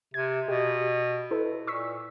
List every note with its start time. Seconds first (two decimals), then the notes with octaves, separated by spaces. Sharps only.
0.14 C3 G#6
0.49 B2 G4
1.31 E4 A4 B4
1.67 A#2 C#6 E6 B6